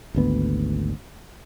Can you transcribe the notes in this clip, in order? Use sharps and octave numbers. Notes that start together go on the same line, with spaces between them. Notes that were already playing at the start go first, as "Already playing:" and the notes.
G#1 D2 B3